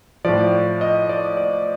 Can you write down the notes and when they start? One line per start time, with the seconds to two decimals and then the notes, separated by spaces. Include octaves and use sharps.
0.25 A2 F3 D5
0.81 D#5
1.09 D5
1.37 D5